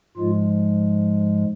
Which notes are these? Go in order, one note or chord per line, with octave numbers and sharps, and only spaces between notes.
G#2 F3 G#3 F4